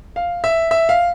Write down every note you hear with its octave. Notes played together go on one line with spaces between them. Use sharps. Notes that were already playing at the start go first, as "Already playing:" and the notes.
F5
E5
E5
F5